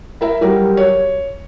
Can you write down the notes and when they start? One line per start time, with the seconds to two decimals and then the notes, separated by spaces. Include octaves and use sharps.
0.21 E4 A#4 E5
0.41 F#3 G3 F#4 G4 A#4
0.77 C#5